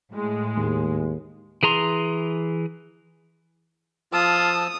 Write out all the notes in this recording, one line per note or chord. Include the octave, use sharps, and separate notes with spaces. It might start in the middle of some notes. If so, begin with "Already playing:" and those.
A2 G#3
D#2
E3 G#4 A#5 C6
F3 F4 A5 D#6 E6